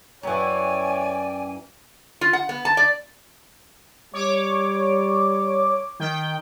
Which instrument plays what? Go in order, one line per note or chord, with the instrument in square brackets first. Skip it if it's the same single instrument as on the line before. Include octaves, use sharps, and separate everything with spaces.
[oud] F#2 E3 [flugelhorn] C#5 [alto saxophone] D5 [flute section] G5 G#5
[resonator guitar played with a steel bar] F4
F#5
B3
A5
D5
[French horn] G3 [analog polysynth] C#5 D6
[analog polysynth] D#3 G5